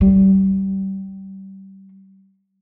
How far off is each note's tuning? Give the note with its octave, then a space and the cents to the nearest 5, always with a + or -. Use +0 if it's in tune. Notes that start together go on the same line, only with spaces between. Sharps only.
G3 -25